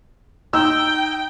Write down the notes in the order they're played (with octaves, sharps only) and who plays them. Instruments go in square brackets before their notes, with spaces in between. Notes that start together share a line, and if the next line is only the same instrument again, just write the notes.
[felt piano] D#4 E6 [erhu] G5